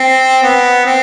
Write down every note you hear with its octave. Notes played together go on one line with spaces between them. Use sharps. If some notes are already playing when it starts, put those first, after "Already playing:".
Already playing: C4
B3
C4